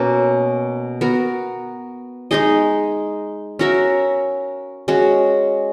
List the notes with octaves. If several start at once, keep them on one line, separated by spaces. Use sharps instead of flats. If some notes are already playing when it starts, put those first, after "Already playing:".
Already playing: B2 A#3 C#4
B3 F#4 A#4
G#3 D#4 G#4 D#5
C#4 F#4 A#4 E5
G#3 C#4 F#4